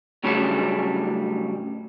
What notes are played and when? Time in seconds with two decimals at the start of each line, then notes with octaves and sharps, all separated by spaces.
0.24 A2 C#3 F#3 G3 C#4 D4